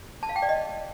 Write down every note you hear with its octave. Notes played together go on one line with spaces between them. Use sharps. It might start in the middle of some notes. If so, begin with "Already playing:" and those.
A5
F5
G5
D5
D#5